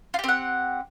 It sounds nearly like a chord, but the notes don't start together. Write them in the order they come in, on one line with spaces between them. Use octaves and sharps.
F4 G4 C4 F#5